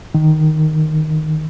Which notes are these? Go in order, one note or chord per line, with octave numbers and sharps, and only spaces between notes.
D#3